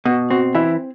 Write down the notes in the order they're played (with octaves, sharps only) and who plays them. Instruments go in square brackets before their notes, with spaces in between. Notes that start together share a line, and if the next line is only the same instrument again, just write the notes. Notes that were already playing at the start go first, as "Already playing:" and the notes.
[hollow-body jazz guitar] B2 [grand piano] F#4
[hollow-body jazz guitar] C4 [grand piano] F#4
[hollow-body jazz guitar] E3 [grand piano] E4